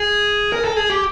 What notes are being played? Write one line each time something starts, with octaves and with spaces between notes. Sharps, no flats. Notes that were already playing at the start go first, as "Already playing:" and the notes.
Already playing: G#4
A#4
A4
G#4
G4